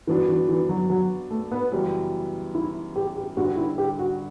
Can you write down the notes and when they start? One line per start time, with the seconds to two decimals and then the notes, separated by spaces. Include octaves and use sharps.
0.07 G2 E3 F#3 B3 D4 F#4
0.28 E3
0.49 E3
0.69 F#3
0.90 F#3
1.31 A3
1.52 B3
1.72 F#2 C#3 E3 G3 B3
2.55 E4
2.96 G4
3.16 G4
3.37 G1 G2 D3 G3 F#4
3.57 E4
3.78 G4
3.99 F#4